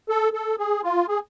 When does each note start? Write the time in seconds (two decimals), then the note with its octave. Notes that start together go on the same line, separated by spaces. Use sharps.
0.09 A4
0.33 A4
0.59 G#4
0.84 F4
1.08 G#4